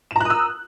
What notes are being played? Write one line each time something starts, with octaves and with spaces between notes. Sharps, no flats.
A#5 D#6 E6 F#6 E7